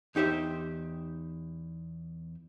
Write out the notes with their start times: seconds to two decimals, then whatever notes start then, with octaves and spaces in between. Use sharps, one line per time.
0.15 E2 D#4 G4 C5 E5